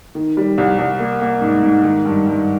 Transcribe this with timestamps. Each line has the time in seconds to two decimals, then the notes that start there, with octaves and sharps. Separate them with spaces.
0.15 D#3
0.37 G3
0.58 C2
0.79 C2
0.99 A#3
1.21 A#3
1.41 G#2
1.63 G#2
1.83 D#3
2.05 G2
2.27 G2